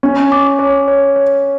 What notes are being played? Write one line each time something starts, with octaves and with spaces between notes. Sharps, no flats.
C#4 C#5
D6
C#5
C#5
C#5